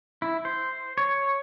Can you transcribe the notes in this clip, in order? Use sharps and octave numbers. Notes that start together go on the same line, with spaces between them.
E4
C5
C#5